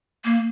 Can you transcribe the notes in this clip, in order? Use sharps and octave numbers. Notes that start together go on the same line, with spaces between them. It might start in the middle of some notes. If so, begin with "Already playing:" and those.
A#3